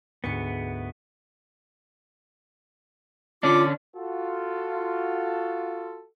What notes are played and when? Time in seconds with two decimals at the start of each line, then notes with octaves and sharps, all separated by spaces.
0.24 D2 G#2 B3 C#7
3.43 D3 C#4 D4 F4 D6
3.96 F4 F#4 A4